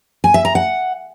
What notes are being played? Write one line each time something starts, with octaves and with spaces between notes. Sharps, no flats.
G#5
E5
A#5
F#5